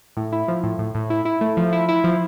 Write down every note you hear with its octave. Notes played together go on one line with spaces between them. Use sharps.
A2
E4
F3
A2
A2
A2
E4
E4
A3
F3
E4
E4
F3